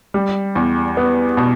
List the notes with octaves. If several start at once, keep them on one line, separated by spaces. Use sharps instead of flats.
G3
E2
B3
B2